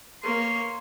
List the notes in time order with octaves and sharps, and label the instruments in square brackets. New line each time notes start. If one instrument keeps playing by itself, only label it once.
[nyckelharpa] A#3 C#5 [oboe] C6